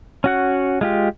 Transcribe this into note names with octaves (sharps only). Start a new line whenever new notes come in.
C#4 F#4 F#5
G#3 F4 G4